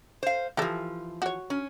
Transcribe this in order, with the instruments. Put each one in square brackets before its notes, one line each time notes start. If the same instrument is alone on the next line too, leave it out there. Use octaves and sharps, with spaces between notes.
[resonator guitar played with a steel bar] C5 F5
[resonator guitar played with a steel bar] E3 F3 [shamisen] G4 A4
[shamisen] F#4 C#5
[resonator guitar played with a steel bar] C#4